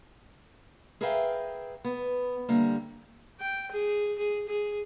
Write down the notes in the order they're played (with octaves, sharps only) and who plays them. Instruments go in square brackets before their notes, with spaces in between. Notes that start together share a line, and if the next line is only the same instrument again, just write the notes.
[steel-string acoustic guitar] G#4 A#4 B4 E5 F5 G5
B3
D3 G3 A#3
[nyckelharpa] G5
G#4
G#4
G#4